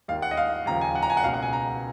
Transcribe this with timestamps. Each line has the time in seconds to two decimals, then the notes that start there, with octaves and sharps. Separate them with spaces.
0.08 D#2 D#3 A#3 F5
0.22 F#5
0.31 D#5
0.37 F5
0.66 D#2 C#3 F3 A#3 A#5
0.81 G#5
0.95 F#5
1.03 A#5
1.10 G#5
1.17 F#5
1.23 C#2 B2 A#3 F5
1.34 F#5
1.43 G#5
1.53 A#5